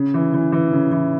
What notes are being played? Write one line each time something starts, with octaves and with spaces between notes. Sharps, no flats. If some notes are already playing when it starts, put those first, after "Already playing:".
Already playing: C#3
E3
E3
E3
C#3
E3